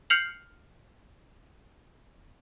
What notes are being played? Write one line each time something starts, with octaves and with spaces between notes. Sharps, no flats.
F6 G6 C7 C#7 F7 F#7